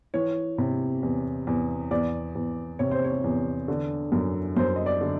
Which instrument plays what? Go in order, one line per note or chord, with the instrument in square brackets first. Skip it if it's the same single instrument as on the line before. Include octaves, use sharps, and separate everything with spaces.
[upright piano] E3 C#5
C3
E2
E2
E2 D5
E2
C3 C#5
C5
C#5
E2
D3
F#2
F#2 C5
D#5
D5
D3